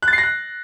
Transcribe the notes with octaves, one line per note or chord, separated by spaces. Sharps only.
F#6
A6
C7
A#6
F#6